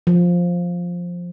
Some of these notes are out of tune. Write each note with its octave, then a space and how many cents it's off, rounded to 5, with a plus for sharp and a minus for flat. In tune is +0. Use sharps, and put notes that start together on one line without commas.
F3 +5